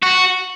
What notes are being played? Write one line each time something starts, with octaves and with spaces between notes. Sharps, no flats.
F#4